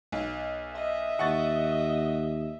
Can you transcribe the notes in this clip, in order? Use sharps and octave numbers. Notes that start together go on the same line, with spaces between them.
B1
D#5 E5
D#2 F#5 C#6 A6